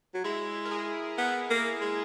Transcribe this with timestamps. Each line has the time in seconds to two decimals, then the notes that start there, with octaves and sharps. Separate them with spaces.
0.14 F#3
0.24 G#3 E4
0.65 A#4
0.71 G#4
1.18 B3
1.50 A#3
1.81 G#3